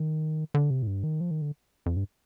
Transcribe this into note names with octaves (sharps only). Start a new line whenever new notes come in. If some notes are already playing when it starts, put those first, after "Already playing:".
Already playing: D#3
D3
C3
A2
G2
D#3
F3
D#3
D3
F2
G2